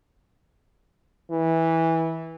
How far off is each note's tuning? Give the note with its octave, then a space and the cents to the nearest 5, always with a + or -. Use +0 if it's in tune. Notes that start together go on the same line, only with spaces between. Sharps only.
E3 -15